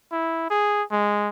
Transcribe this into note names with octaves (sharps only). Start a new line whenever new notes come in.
E4
G#4
G#3